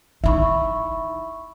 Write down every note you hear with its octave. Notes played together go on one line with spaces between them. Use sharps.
D#4 E4 E5 B5 C#6